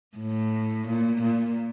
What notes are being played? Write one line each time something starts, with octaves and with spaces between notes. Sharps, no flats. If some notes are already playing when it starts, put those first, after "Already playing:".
A2
A#2
A#2